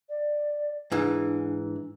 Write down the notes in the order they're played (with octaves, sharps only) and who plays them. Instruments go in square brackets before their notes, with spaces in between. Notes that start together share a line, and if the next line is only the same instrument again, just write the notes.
[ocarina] D5
[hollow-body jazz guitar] G#2 E3 [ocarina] D4